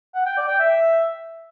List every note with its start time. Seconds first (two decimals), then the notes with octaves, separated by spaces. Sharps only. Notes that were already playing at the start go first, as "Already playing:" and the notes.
0.15 F#5
0.26 G5
0.37 D5
0.48 G5
0.59 E5